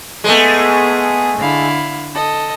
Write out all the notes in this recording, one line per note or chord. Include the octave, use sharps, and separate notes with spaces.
G#3 A3 B3 G#4
D3 E4 F5
A4 D#5